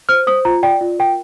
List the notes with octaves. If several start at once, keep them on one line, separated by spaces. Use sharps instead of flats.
C5 F6
C5 D#6
F4 A#5
D5 G5
F4
A#4 G5